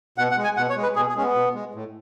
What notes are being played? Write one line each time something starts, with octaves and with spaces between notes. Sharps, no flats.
B2 F#5
F#5
G#3
G#5
B2 F#5
C#5
G#3
B4
B2 G#4
G#4
G#3 C#4
B3
B2
G#3
A2